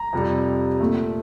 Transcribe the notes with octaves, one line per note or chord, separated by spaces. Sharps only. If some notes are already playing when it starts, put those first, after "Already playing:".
Already playing: A#5
F2 C3 G3
A#2 A3